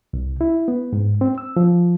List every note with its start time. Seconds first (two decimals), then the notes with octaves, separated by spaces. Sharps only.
0.13 C2
0.41 E4
0.68 B3
0.93 G#2
1.21 C4
1.38 E6
1.56 F3